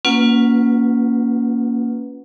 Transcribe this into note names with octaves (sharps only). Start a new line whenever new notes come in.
A#3 C#4 F4 B4 F#5